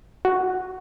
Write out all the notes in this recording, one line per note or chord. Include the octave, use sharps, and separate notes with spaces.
F#4